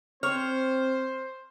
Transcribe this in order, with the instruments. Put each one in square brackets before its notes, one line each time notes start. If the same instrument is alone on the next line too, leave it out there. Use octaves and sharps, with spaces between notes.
[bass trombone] C4 [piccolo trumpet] C5 [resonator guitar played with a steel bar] C#5 [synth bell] F6